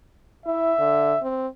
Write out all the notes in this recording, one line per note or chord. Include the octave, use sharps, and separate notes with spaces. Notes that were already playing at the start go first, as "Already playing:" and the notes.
E4 E5
D3
C4